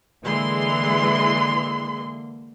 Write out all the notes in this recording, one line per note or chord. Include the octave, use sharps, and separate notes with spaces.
D3 E3 G#3 A#3 C6